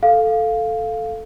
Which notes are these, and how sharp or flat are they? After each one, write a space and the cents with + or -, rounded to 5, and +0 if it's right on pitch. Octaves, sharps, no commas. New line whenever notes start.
A4 +0 F5 +0